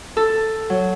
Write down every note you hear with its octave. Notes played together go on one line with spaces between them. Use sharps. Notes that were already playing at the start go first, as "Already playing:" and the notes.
A4
F#3